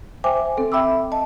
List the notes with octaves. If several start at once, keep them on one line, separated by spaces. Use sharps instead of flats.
C5 E5 G5 G#5 D6
C4 A4
E5 G5 B5 D6 E6
D#5 A5